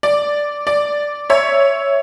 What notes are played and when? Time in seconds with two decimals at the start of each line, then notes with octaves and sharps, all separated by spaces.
0.03 D5
0.67 D5
1.30 C#5 E5